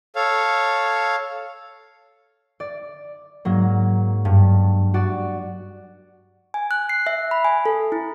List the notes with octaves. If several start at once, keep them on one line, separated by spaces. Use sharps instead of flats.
A4 C#5 F5
D5
G#2 F#3 A#3
G2
F#4 D5
G#5
F#6
C7
E5
B5
G#5
A4
E4